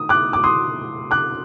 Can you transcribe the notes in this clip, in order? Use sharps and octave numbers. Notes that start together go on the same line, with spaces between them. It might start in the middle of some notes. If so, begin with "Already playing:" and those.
Already playing: D#3 D#6
D6 F#6
D6
C6 D#6
D6 F#6